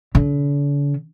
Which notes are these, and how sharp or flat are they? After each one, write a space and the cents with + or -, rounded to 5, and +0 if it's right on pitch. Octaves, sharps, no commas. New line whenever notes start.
D3 -45